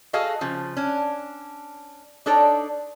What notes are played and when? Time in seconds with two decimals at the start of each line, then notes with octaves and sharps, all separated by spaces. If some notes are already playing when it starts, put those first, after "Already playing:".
0.13 F#4 G#4 A4 D#5 F5
0.41 C#3 F3
0.77 C#4 D4
2.26 D4 D#4 A4 C#5 D5